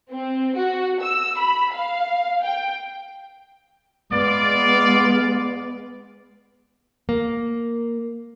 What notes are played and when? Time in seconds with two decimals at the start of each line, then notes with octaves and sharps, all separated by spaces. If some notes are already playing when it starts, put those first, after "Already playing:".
0.10 C4
0.56 F#4
1.01 E6
1.38 B5
1.72 F5
2.42 G5
4.13 G#3 B3 F4 D5
7.09 A#3